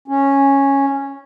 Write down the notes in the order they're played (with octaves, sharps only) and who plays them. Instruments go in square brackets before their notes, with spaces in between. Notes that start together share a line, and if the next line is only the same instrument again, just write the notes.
[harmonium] C#4